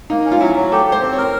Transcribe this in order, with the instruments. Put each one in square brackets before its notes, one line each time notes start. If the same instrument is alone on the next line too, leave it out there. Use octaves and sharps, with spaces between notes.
[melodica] A#3 [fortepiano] D#4
[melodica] C#4
[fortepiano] F4
[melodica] F#3 [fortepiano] E4
[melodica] F#3
[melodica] G4 [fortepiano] A4
[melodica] G4
[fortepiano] C5
[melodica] C4
[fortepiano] C#5
[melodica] A#4